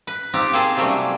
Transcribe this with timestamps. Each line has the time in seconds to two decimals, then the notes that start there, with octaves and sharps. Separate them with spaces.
0.07 B4
0.33 C4 D#4 F4 G4
0.53 A#3 C4 G#4 C5 G5 A5
0.77 C3 F#3 G3 A3 A#3 C#4